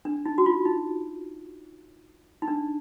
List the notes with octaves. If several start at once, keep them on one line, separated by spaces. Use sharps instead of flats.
D4
D#4
F#4
F4
D#4
D#4
D4